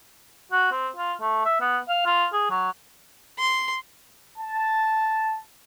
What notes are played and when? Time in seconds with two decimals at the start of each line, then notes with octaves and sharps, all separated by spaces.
0.52 F#4
0.72 C4
0.97 F4
1.21 A3
1.45 E5
1.61 B3
1.88 F5
2.06 F4
2.33 G#4
2.51 F#3
3.38 C6
4.38 A5